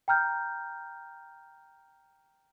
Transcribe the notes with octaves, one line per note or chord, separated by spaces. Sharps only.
G5 A#5 F6 G6